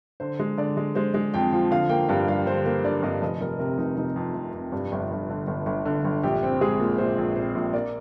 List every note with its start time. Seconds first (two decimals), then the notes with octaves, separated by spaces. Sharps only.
0.20 D3 C5
0.39 G#3
0.58 D3 D5
0.77 G#3
0.95 G#3 C5
1.14 G#3
1.34 F2 G5
1.52 F3
1.71 D3 F5
1.89 A#3 G5
2.09 G2 F5
2.27 G3 F5
2.46 D3 C5
2.66 A#3 C5
2.84 D3 D5
3.03 G2 D#5
3.21 F1 D#5
3.41 F1 A#4
3.59 C3 A#4
3.78 F1 D#4
3.97 F1 D#4
4.16 F2
4.34 F1
4.53 F2
4.72 G2
4.92 G1
5.11 G1
5.30 D3
5.47 G1
5.66 G1
5.86 D3
6.04 G1
6.23 A#1 G4
6.43 C4
6.61 G#3 G#4
6.79 A#2
6.98 A#2 C5
7.18 A#1
7.36 C4 C5
7.55 A#1
7.73 A#3 D5